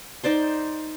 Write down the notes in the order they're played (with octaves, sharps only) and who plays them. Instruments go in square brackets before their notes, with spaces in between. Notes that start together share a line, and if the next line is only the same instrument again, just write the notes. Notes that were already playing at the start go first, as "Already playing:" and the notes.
[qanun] D#4 C5 D5 C6